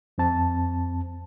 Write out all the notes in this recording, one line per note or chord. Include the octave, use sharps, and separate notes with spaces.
F2 C4 A5